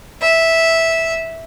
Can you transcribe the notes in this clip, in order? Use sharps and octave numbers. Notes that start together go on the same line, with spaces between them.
E5